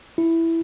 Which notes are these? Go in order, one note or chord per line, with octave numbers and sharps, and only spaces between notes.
E4